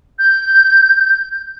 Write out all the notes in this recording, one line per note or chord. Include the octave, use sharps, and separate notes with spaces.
G6